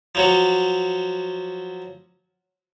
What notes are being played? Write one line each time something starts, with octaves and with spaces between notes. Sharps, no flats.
F3 F#3 F#4